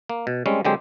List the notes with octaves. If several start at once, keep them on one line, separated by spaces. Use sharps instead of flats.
A#3
B2
G3 G#3 C4 C#4
D3 F#3 G#3 C4 G4